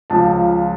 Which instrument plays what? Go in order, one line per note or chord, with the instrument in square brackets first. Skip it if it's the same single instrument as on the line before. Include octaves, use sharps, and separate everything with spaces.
[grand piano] C#2 C#3 F3 A5